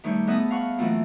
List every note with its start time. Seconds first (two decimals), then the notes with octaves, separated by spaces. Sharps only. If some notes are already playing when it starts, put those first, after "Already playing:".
0.04 D#3 G3 A3 C#5 G6
0.27 A3 B3 G#4 B4 D#5 A5
0.51 F5 F#5 C#6
0.78 A#2 E3 F#3 A3 A#3 C4